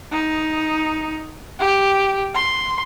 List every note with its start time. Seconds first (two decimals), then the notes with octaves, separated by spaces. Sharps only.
0.12 D#4
1.59 G4
2.34 C6